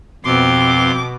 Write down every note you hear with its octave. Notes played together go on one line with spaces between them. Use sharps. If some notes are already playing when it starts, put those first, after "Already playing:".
F2 B2 C4 C6 D6